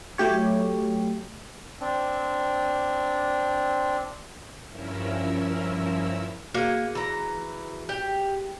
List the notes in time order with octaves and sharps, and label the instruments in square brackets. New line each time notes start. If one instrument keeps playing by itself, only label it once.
[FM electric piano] F#3 A3 G4 C#5
[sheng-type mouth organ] C4 D4
[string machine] G2 F3 C#4 E4 A#4 E6
[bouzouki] A#3 [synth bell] F#4 G#4
[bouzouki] E3 A#5
G4